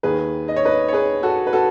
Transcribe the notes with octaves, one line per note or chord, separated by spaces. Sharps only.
D#2 D#3 G#4 B4
D#5
C#5
B4 D#5
C#5
G#4 B4
F#4 A4
B4
F#4 A4